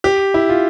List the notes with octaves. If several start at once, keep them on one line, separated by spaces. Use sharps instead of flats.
G4
E4
F4